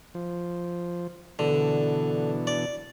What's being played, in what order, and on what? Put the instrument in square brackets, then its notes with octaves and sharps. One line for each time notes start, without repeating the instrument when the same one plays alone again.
[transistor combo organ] F3
[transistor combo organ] B2 E3 D4 [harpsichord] D3
[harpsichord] D5